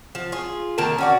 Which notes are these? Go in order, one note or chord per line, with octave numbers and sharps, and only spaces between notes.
F3
F4 G#4
D#3 A#3 A#4 A5
C#4 F#4 D5